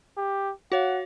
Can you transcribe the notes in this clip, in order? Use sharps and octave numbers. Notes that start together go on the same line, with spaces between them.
G4
F#4 C#5 F5 F#5